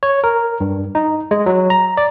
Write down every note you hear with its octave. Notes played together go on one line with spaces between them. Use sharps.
C#5
A#4
G2
D#4
G#3
F#3
A#5
D5